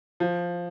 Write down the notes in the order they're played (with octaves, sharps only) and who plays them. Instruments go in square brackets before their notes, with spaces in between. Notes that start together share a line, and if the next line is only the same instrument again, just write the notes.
[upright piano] F3